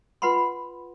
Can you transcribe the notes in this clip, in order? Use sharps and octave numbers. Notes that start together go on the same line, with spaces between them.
F4 B4 F#5 B5 C6